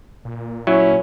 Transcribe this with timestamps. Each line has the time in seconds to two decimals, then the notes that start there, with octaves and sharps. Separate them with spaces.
0.25 A#2
0.67 F#3 C#4 E4